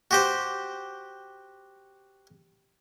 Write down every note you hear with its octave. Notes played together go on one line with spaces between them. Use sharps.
F#4 G4 C5